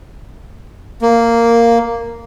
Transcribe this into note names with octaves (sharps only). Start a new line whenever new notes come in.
A#3